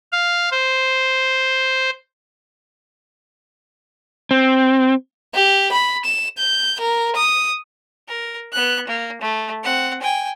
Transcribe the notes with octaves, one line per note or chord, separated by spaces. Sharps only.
F5
C5
C4
G4
B5
E7
G6
A#4
D#6
A#4
B3 F#6
A#3
A3
C4 F#5
G5 G#5